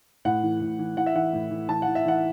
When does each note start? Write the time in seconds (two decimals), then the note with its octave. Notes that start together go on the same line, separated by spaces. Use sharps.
0.25 A2 F#5
0.43 E3
0.61 A2
0.79 E3
0.97 E3 F#5
1.06 E5
1.15 E3 F#5
1.33 A2
1.51 E3
1.69 E3 A5
1.82 E3 F#5
1.95 E5
2.05 E3 F#5